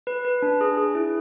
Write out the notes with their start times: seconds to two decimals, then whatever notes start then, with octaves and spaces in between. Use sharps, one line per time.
0.07 B4
0.25 B4
0.42 D4
0.61 G#4
0.77 G#4
0.95 E4